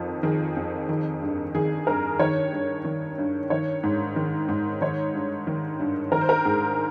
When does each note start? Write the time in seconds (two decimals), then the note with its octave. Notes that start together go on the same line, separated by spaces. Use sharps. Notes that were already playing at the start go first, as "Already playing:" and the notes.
Already playing: F2 D#3 F4
0.23 D#3 G#4
0.56 F2
0.89 D#3
1.21 G2
1.55 D#3 G#4
1.87 G2 A#4
2.19 D#3 C#5
2.53 G2
2.84 D#3
3.18 G2
3.50 D#3 C#5
3.83 G#2
4.16 D#3
4.48 G#2
4.81 D#3 C#5
5.14 G2
5.47 D#3
5.80 G2
6.12 D#3 A#4
6.21 C5
6.29 A#4
6.45 G#2 G#4